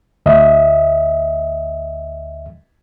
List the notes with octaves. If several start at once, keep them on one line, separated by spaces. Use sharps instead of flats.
D2 D#5 E5